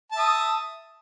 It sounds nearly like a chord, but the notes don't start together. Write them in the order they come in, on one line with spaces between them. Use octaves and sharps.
A5 E5 D#6